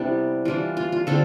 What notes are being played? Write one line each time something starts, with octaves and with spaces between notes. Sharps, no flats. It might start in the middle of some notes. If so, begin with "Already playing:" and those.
Already playing: C3 G3 B3 D4 E4 G4
E3 G3 D4 F4
F4
F4
D3 G3 C4 F4 A4